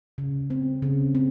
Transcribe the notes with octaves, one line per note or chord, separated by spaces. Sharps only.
C#3
C4
C#3
C4